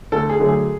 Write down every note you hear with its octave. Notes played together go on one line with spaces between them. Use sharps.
D2 A4
G#4
D3 F#3 A3
G#4